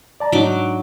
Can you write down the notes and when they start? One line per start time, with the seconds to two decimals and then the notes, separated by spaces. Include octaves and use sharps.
0.20 D5 A5 A#5
0.32 G#2 F#3 D4 D#4 D6